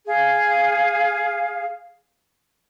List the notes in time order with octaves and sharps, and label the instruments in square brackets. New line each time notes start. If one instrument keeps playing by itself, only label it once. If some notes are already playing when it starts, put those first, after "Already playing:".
[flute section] G#4 F5